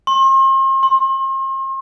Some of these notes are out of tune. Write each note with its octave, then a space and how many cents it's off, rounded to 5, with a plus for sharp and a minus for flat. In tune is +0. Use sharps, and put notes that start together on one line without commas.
C6 +40
C6 +25